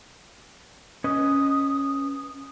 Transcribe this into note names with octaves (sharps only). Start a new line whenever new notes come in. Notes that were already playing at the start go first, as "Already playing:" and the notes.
C#4 B4 D#5 D#6